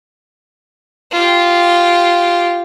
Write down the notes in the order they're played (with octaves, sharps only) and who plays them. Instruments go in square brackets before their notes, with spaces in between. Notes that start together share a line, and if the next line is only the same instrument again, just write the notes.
[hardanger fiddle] F4 G4